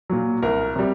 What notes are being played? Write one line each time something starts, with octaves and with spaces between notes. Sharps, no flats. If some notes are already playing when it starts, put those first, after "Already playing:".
A#2 F#3
C2 A#4
C3 G3